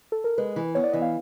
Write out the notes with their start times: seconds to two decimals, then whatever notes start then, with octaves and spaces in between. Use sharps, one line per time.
0.12 A4
0.24 A#4
0.38 G#3 B4
0.56 E3
0.75 B3 C#5
0.84 D5
0.93 E3 D#5
1.02 F5